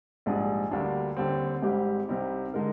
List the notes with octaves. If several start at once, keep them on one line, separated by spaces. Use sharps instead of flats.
A#1 G#2 G3 D4 G#4
D2 D3 G3 A#3 D4
D#2 D3 G3 C4
G#1 G#2 G3 C4 G4
C2 C3 G3 C4 D#4
D3 G#3 D#4 A#4